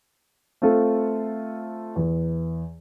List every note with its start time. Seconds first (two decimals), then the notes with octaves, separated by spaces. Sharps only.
0.62 A3 C4 F4 A4
1.96 E2